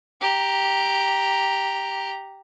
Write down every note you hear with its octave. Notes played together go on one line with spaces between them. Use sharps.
G4 A#5